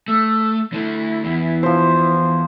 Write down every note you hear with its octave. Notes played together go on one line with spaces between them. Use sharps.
A3 E6
D3 A3 E4
E2
F3 C5